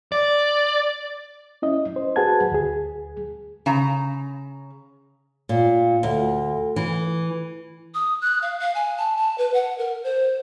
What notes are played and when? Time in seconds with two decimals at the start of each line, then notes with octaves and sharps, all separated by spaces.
0.12 D5
1.62 C#4 E4 D#5
1.96 C5
2.16 F#4 G#4 B4 F#5 A5 G#6
2.52 D2 G#4
3.66 C#3 A#5
5.49 A#2
6.03 D2
6.76 E3
7.94 D#6
8.22 F#6
8.42 F5
8.60 F5
8.75 G#5
8.98 A5
9.17 A5
9.38 B4
9.54 F#5
9.78 A#4
10.04 C5